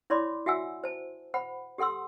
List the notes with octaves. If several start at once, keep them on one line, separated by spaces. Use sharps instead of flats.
E4 C#5 D5 B5 C6 D6
F#4 E5 F#5 G#5 E6
C5 A5
C5 F#5 B5
G4 A4 F#5 C6 E6